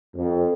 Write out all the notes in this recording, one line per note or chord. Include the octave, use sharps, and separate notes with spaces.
F2